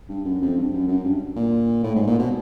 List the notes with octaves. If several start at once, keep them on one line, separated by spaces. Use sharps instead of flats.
G2
F#2
F2
G2
F#2
F#2
G2
A#2
A2
G#2
A#2
B2